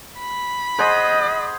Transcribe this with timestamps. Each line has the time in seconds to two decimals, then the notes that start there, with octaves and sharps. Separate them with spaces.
0.19 B5
0.79 G#4 C5 D#5 F#5